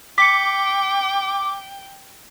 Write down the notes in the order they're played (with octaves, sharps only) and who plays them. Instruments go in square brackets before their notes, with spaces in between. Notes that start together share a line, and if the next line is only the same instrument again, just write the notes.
[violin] G5 [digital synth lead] D6 [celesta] B6 C#7